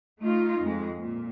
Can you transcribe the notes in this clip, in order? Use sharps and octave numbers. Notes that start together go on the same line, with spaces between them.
A3 D#4 F4
F2 G#3
A#2